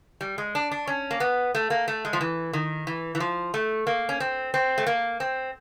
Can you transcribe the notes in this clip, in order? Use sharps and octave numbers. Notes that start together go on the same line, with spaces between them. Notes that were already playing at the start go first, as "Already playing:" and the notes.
G3
G#3
D4
D4
C#4
A#3
B3
A3
A#3
A3
G#3
F3
E3
D#3
E3
E3
F3
A3
A#3
C#4
C4
C4
A3
A#3
C4